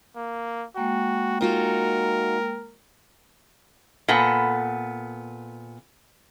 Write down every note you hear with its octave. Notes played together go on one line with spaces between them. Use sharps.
A#3
G#3 A#3 F#4 G5
D#4 F4 F#4 A#4
A#2 B3 A4 F#5